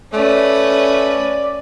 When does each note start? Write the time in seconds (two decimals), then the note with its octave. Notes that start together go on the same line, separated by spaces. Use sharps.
0.13 A3 C#4 B4 D5